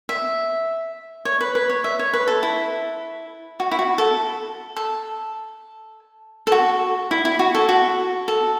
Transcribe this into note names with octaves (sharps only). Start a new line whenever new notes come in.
E5
C#5
B4
B4
C#5
E5
C#5
B4
A4
E4
F#4
E4
F#4
A4
A4
A4
F#4
E4
E4
F#4
A4
F#4
A4